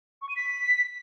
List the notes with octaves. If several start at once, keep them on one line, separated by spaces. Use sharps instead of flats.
C#6
D#7
B6